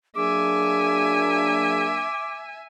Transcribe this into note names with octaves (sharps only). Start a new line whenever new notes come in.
F#3 A#3 D4 G#4 E5 G#5 D6